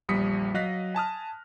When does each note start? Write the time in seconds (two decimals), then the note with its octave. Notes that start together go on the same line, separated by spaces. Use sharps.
0.09 A#1 E2 G3 D#6 B6 C#7
0.54 F#3 D#5 F5 F#6 A#6 B6
0.95 G#5 A5 D#6 F6